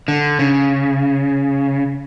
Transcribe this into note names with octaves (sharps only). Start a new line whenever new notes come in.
D3
C#3